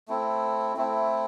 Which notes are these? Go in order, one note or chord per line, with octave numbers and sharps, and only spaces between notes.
A3 C4 E4
A3 C4 E4